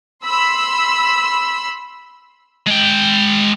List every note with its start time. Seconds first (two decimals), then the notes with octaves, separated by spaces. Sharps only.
0.24 B5 C6 E6
2.66 G#3 G5